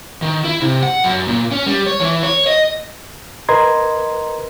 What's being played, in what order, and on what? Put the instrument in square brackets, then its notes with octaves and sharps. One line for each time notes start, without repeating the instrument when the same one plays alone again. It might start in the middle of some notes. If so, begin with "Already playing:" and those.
[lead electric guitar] D#3
E4
C3
F#5
F#2
A#2
C#4
G3
C#5
E3
C#5
D#5
[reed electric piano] A#4 B4 D#5 A#5 C6 G#6